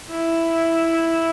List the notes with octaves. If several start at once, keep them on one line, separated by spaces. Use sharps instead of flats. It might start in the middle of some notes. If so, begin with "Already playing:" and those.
E4